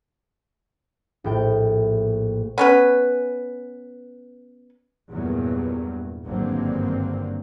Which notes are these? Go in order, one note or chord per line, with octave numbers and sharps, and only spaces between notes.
A#1 A2 G5
B3 C#4 B4
E2 G2 A#2 F#3 G3
G#1 G2 D3 F#3 A#3 C4